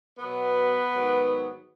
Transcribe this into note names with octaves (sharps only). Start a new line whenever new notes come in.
B2 F#3 B3 B4
G#2 D#3 F#3